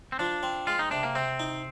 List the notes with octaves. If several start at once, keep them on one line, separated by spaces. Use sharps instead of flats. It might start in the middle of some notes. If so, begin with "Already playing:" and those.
C4
F3 D4
C4
G#3 F4
D#4
C3 D4
A#3
C3 C4
D#4